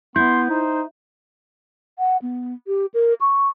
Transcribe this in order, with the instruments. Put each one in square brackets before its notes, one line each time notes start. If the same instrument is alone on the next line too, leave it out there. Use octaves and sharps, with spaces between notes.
[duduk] B3 [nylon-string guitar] E4 [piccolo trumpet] C6 [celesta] G6
[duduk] D#4 [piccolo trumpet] C5
[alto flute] F#5
B3
G4
A#4
C#6